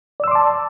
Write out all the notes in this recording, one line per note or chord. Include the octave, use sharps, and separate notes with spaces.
D5 A5 C6 D6 E6